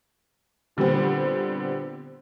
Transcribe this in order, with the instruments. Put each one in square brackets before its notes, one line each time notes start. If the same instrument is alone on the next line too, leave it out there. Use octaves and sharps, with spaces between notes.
[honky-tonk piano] A#2 D3 G3 B3 C4